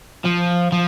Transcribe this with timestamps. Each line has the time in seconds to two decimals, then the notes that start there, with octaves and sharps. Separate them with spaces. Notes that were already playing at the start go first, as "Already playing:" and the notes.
0.25 F3
0.72 F3